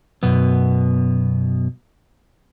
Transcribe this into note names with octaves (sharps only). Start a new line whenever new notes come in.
F#2 B2 B3